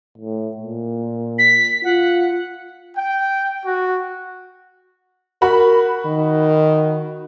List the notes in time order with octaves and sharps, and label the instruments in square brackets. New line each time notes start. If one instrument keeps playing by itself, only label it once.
[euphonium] A2
A#2
[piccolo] B6
[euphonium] F4 [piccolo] F#5
[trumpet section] G5
F#4
[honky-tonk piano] F#4 B5 [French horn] A#4
[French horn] D#3